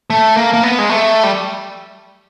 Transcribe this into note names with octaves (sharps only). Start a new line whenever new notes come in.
A3
A#3
A#3
B3
G#3
A3
G3